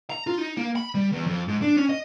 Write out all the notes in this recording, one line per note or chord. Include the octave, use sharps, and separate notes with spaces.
A#5
F4
D#4
A#3
B5
G3
E2
F2
G#2
D4
C#4
D#5